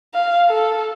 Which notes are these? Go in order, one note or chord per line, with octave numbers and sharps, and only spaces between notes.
F5
A4